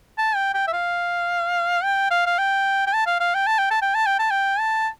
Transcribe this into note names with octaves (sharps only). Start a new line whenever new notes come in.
A5
G5
G5
E5
F5
G5
F5
F5
G5
G5
A5
F5
F5
G5
A5
G5
A5
G5
A5
G5
A5
G5
A5